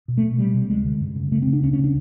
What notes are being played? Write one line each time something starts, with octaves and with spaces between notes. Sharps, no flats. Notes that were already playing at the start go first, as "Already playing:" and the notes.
B2
A3
B2
C3 G3
C3
D2 G#3
D3
F#2
C#3
C#3 A3
C4
C#3
D4
C#2 C#4
C#4
C#3
D4